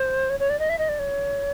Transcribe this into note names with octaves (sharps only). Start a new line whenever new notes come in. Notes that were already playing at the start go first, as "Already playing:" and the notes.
Already playing: C5
C#5
C#5
D5
D#5
E5
D#5
D5
C#5